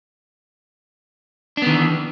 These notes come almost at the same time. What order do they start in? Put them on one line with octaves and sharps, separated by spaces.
D4 B3 D#3 E3